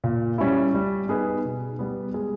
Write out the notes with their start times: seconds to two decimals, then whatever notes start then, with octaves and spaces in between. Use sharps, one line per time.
0.04 A#2
0.38 G3 C#4 E4
0.75 G3
1.09 B3 D#4 G#4 B4
1.45 B2
1.79 G3 B3
2.14 G#3